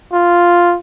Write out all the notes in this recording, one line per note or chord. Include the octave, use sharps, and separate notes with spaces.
F4